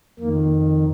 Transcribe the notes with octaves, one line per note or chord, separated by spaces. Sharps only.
F2 D#3 A#3